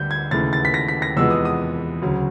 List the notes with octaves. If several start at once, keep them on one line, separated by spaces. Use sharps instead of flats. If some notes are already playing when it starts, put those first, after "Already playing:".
Already playing: D2 D3 G3 G6
G#6
D#2 C#3 E3 A3 A6
A6
B6
A#6
B6
A#6
E2 C3 F3 G#3 B3 E6
D#6
D#6
D2 C#3 F#3